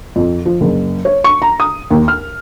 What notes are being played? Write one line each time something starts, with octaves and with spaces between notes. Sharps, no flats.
F2
F3
F#1
C#5
C#6
A#5
D#6
D#2
F6